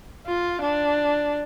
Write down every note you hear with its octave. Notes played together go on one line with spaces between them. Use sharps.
F4
D4